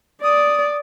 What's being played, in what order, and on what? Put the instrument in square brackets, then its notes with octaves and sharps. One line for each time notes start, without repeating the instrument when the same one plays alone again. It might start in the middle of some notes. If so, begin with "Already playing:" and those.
[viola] D5 [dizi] D#6